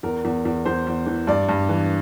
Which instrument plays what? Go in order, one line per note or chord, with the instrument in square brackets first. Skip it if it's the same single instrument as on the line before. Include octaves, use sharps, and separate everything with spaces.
[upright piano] E2 A#4
E2
E2
E2 C5
E2
E3
G2 D5
G2
E3